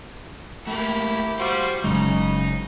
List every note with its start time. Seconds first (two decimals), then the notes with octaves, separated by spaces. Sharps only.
0.67 A3 A#3 E4 G4
1.40 G3 F4 F#4 C5
1.84 F#1 C#3 F#3 G#3 D#4